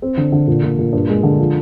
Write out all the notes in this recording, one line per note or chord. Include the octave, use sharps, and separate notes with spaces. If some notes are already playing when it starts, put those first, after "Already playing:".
C4
D3
D3
A#2
A#2
A#2
G2
G#3
D3
F3